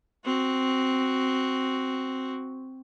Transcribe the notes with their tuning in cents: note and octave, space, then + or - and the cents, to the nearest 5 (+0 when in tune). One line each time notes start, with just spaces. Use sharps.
C4 +0 F#4 +5